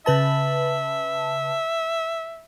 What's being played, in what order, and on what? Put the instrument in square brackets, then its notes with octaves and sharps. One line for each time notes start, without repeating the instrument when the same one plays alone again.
[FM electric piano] C#3 B4 A5 [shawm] E5